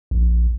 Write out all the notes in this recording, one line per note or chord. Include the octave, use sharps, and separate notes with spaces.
A#1